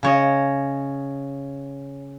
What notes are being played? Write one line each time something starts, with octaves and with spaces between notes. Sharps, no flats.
C#3 C#5 D#5